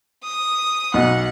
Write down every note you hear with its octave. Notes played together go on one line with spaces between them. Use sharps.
D#6
B1 F#5